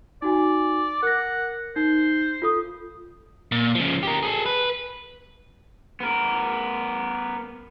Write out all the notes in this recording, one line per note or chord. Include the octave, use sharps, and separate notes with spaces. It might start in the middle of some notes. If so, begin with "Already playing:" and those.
D#4 F#4 D5 G#5
A#4 F#5 F#6 A#6
D#4 C5
F4 A4 D#6
A#2
C#3 F3
G4 A#4
G#4 A4
B4
B3 A#4